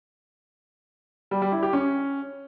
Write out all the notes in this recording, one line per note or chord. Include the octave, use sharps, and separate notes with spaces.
G3
G3
E4
G4
C#4